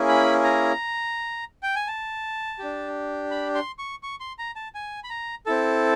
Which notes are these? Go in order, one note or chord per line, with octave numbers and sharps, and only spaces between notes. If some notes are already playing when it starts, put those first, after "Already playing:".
Already playing: A#3 C#4 E4 G#4
B5
A#5
G5
G#5
A5
D4 G4
B5
C6
C#6
C#6
C6
A#5
A5
G#5
B5
A#5
C4 E4 A4 A5